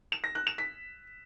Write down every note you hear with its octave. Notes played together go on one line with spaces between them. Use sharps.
E7
A#6
F#6
E7
B6